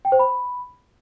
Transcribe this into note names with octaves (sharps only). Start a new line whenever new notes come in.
G5
C5
B5